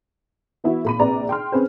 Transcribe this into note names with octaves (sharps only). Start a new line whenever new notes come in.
E3 B3 E4 F#4
A#2 B5 D#7
A#1 C3 B4 D5 A#5
G5 C6 F6
C4 C#4 G#4 B4 C5